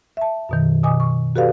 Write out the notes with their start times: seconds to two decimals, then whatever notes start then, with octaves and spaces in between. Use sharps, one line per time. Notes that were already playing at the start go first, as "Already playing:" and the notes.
0.17 E5 A5
0.49 F#2 B2 D#3
0.83 B2 D#5 G#5 D6 D#6
1.00 C#6
1.36 F#4 G4 A4 B4 D5 F5